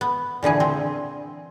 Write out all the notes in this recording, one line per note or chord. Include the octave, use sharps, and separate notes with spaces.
B3
A#2 D3 E3 G#4
C4